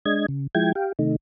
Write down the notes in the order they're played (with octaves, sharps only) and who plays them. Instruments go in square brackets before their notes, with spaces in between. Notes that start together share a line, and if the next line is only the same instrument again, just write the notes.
[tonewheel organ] G#3 D4 D#5 G#6
C#3
F3 G#3 E4 G5 G#6
G4 F5 G5
C3 D#3 A3 D#4